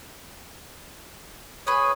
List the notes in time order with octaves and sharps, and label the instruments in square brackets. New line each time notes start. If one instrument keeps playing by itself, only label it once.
[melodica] G#4 C#5 [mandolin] B4 G#5